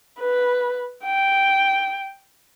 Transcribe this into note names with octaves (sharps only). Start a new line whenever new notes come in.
B4
G5